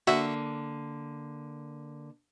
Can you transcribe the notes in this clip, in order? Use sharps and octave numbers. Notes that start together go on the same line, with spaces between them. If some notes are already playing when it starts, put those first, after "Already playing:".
D3 A#3 F#4 E5